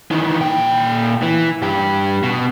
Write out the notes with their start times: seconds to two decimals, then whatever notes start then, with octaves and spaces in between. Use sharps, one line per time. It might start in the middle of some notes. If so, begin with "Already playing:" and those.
0.11 D#3 E3
0.40 A#2 G5
1.22 E3
1.62 G2 G4
2.23 B2